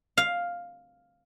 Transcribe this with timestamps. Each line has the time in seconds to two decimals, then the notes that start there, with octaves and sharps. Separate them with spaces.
0.17 F5